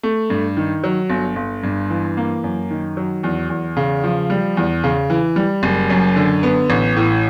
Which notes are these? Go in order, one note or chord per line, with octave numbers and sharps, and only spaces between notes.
A3
G2
D#3
F#3
G1
G1
G2
E3
A#3
F#2
D#3
F#3
E2
E2
C#3
F3
G3
E2
C#3
E3
G3
F#1
F#2
D3
B3
A1
A2